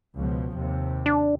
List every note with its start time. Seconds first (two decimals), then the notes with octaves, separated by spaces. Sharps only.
0.15 C#2 B2 F3
0.54 D#2 C3
1.06 D4